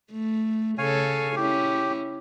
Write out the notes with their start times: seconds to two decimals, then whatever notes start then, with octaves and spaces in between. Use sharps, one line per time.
0.12 A3
0.78 C#3 A4 C#5 F5 G#5
1.36 C#4 E4 G4